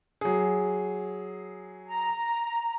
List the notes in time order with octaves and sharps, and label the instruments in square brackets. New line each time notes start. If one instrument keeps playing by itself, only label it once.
[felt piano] F#3 G#4
[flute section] A#5